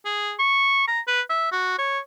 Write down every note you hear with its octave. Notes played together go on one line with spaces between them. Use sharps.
G#4
C#6
A#5
B4
E5
F#4
C#5